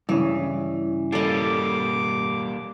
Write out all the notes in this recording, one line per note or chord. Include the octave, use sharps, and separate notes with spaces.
G2 C#3 E3
G3 A#3 A4 D#5 D6